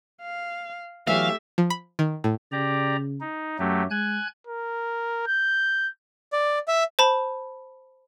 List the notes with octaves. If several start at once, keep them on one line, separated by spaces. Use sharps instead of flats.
F5
E3 F#3 A3 B3 G4 E5 F5
F3
B5
D#3
A2
C#3 G4 D5 A#5
D#4
F#2 F#3 A3 G4
G#3 G#5 F#6 G#6
A#4
G6
D5
E5
C5 A5 B5